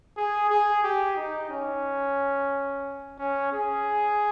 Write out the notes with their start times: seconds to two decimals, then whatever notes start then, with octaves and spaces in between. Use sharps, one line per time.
0.17 G#4
0.50 G#4
0.84 G4
1.17 D#4
1.50 C#4
3.19 C#4
3.53 G#4